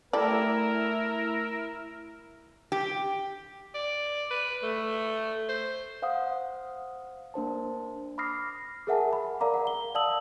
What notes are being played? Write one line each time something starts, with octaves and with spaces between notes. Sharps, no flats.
G3 A3 E4 A4 A#4 D5 E6
G4
D5
B4
A3
C5
C5 F5 F#5 D#6
A#3 D4 C5 A5
B5 D6 D#6 F6 A#6 C7
G#4 A#4 E5 F#5 G#5 A5
B5
A#4 D5 F5 A#5 D6
F#5
G7
D5 F5 A5 D#6 E6 F#7